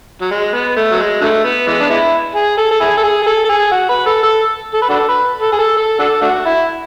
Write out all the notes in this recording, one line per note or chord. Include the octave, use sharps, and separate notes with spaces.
F#3
G#3
B3
A3
F#3
G#3
D3 F#3 A3
B3
E3 G#3 B3
D4
G#3 B3 E4
G#4
A4
A4
E4 G#4
A4
G#4
G#4
A4
A4
G#4
F#4
B4
A4
A4
A4
B4
D4 F#4 A4
B4
A4
G#4
A4
A4
D4 F#4 A4
A3 D4 F#4
E4